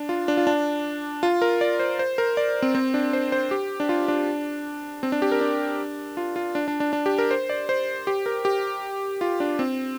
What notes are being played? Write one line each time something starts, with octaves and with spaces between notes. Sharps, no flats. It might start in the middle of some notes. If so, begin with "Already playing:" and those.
Already playing: D4
F4
D4
F4
D4
F4
A#4
D5
C5
C5
A#4
D5
C4
C4
D4
C5
C5
G4
D4
F4
D4
C4
D4
G4
A#4
D4
F4
F4
D4
D4
D4
D4
G4
A#4
C5
D5
C5
G4
A#4
G4
F4
D4
C4